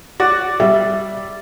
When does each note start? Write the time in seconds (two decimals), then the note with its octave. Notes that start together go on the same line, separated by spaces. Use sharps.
0.20 F#4 D5
0.60 G3 E5